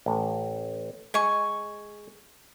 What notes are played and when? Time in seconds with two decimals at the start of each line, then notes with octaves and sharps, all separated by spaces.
0.06 A1
1.14 G#3 G#5 C#6